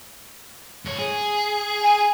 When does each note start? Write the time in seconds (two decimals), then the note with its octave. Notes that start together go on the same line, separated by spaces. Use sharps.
0.85 G#2 C#5
0.99 G#4
1.83 G#5